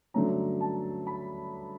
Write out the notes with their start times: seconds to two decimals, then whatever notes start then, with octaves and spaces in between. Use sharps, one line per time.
0.14 G2 D3 F#3 A3 C#4 A#5
0.61 A5
1.07 B5